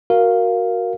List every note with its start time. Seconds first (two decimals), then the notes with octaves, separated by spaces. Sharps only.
0.10 F#4 A#4 F5